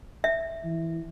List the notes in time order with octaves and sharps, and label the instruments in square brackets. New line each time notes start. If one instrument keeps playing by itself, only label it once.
[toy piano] E5
[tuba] E3